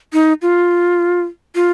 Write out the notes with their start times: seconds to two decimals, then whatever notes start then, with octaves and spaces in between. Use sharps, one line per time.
0.13 D#4
0.42 F4
1.55 F4